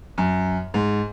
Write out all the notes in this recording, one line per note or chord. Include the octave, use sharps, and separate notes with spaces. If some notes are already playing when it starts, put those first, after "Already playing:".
F#2
G#2